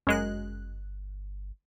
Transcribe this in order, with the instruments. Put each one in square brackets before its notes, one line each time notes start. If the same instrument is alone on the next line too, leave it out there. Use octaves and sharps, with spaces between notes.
[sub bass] G1 [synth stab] F#2 G#3 F#6